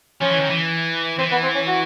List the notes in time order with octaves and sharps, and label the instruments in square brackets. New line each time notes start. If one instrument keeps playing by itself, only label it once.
[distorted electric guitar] F3 [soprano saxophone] C#4
[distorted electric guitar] E3
D#3
E3
[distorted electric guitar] E3 [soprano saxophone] C4
[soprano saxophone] B3
C4
C#4
F#4